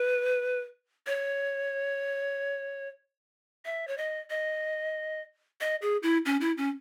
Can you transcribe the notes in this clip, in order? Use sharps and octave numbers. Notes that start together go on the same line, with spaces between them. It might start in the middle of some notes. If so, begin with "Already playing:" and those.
Already playing: B4
C#5
E5
C#5
D#5
D#5
D#5
G#4
E4
C#4
E4
C#4